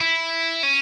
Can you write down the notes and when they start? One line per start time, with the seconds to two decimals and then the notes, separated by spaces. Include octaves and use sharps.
0.01 E4
0.63 C#4